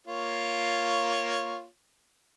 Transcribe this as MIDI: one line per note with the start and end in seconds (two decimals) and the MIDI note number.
0.07 1.65 58
0.07 1.65 65
0.07 1.65 73